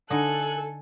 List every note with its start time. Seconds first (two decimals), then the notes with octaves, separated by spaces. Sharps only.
0.10 D3 D#4 A4 G#5 F#6